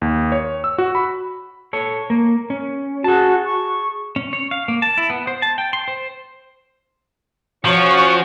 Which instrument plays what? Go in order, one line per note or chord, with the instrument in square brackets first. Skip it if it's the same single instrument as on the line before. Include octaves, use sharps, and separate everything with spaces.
[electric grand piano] D#2
C#5
E6
F#4
B5
[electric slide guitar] A4 C#5
A#3
C#4
[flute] F#4 [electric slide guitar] G#4 A5
[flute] C#6
[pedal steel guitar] C#4
C#5
F5
A#3
A5
E4
B3
C5
A5
G5
C6
C5
[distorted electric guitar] F3 [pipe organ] C#4 F#4 C#6 [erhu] C#5